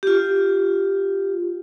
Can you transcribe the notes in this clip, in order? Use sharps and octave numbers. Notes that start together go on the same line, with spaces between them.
F4 G4